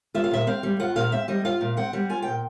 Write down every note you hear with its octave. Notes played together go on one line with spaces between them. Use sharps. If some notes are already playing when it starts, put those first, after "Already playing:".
F4 E5
F5
A#2 E5
C4 F5
G3
F4 F#5
A#2 F5
C4 E5
G3 D#5
F4 F5
A#2
C4 F#5
G3
F4 G#5
A#2 G5